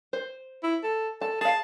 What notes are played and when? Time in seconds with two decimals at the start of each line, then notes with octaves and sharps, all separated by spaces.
0.13 C5
0.63 E4
0.83 A4
1.21 A4 A5
1.41 G#4 F5 A5